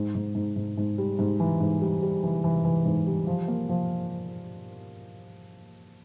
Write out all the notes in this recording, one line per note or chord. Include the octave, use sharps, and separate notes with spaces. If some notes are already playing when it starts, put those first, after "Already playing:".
Already playing: G#2
G#2
G#2
G#2
G#2
G3
G#2
E3
G#2
G3
G3
E3
E3
E3
G#2
G3
F3
A#3
F3